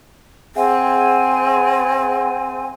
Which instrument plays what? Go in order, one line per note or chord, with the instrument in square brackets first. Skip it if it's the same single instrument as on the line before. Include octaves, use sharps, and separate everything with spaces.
[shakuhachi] C4 [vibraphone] G#4 E5 F#5 [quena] G#5